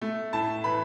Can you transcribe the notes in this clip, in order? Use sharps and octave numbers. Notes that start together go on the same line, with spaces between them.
A3
A2 A5
E3 B5